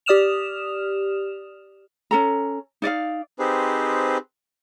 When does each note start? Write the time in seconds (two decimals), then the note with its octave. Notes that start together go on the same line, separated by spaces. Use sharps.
0.06 G4 D5 D#6 F6 E7 F7
2.11 C#4 A4 A#5
2.82 D#4 D5 D#5 F5
3.39 C4 D#4 G4 G#4 B4 C5